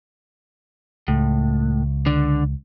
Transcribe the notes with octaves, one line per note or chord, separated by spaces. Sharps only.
C#2 A2
D3